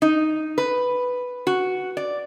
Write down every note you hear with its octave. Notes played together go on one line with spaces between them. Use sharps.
D#4
B4
F#4
D5